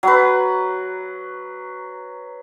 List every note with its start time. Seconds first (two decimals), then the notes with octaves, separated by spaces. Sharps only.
0.03 F#3 B4